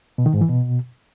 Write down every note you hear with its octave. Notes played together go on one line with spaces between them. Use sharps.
B2
D#3
G#2
E3
B2